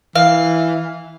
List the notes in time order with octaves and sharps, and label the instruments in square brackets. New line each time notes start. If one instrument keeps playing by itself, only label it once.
[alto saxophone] E3 [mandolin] F5